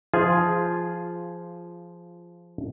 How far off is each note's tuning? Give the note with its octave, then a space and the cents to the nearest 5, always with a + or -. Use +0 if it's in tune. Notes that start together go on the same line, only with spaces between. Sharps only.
F3 -10 F4 +0 G#4 +0